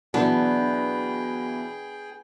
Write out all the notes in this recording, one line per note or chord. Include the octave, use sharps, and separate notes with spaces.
B2 E3 F#3 B3 D4 G#4 G5